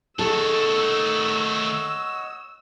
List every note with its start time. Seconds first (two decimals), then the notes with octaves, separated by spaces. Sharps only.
0.19 D#3 A3 G#4 A4 C#5 D#5 F#5 E6